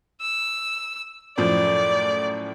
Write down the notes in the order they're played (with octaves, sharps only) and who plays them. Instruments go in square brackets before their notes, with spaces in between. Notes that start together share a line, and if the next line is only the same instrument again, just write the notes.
[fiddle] E6
[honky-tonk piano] F#2 A2 F3 [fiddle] D5